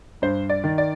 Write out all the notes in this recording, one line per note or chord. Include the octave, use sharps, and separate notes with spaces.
G2 C5
D5
D#3
D5